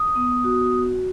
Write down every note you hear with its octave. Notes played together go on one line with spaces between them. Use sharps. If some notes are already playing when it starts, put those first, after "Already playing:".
Already playing: D#6
B3
F#4